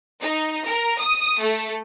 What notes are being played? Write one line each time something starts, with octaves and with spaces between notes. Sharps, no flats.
D#4
A#4
D#6
A3